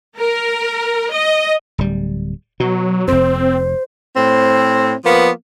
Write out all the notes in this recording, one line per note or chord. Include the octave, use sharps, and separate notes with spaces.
A#4
D#5
D1 G3
B2 F#3
F1 F2 C4 C5
A2 C4
F3 A#3 B3